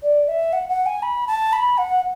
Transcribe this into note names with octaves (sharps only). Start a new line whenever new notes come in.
D5
E5
F#5
F#5
G#5
B5
A5
B5
F#5